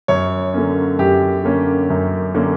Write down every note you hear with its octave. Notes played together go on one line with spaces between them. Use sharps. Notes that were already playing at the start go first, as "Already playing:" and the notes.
F#2 C#5
D3 A#3 C#4
F#2 G4
D3 A#3 C#4
F#2
D3 A#3 C#4